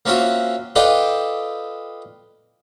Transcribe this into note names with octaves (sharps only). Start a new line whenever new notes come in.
A#3 C4 C#4 F4 F#4 E5
F4 A4 B4 D5 D#5 G5